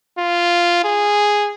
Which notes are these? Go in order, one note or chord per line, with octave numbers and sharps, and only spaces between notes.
F4
G#4